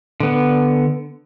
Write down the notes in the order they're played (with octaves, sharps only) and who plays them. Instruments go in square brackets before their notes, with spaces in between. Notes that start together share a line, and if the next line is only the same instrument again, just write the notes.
[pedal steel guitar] D3 B3